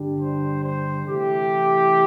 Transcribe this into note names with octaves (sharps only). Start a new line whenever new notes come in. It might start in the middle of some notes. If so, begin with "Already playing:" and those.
Already playing: G2 D3 G3 D4
C5
C5
C3 E3 A3 E4 G4